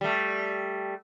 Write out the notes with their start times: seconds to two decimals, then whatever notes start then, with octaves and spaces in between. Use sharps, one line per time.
0.01 G3 A3